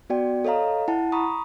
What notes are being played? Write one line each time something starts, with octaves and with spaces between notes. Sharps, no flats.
B3 F#4 D5 G5
A4 C#5 D#5 F5 A#5
E4 F#5 A5
A#5 B5 C#6 D#6